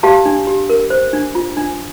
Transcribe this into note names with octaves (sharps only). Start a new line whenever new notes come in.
G4 F5 A5
D4
G4
A#4
C5
D4
F4
D4